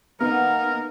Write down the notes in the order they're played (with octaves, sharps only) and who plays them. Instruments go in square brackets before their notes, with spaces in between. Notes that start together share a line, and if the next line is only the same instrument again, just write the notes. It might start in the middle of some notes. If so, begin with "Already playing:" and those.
[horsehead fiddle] A#3 D#4 [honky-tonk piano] B3 [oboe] A#4 [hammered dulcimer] F5 F#5